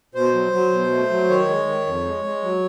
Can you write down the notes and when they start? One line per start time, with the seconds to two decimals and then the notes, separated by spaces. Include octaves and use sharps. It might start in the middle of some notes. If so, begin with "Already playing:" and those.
0.15 B2 C5
0.34 F#3
0.53 F#3
0.72 B2
0.91 A3
1.10 F#3
1.29 D#3 C#5
1.48 G#3
1.66 D#3
1.86 F2
2.05 G#3
2.24 G#3
2.43 F#3